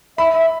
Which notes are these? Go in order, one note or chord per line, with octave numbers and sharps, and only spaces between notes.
E5 B5
E5